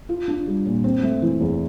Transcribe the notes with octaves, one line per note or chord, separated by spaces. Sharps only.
F4
D4
G3
A#2
C4
A3
E3
E2